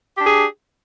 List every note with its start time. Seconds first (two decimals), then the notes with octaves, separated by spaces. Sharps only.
0.17 G4
0.21 D4
0.25 G#4